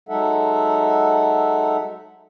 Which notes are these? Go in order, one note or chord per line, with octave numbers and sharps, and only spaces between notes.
F#3 G#3 D#4 A4 E5 F#5